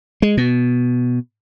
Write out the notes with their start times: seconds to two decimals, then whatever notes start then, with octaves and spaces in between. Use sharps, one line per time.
0.22 G#3
0.37 B2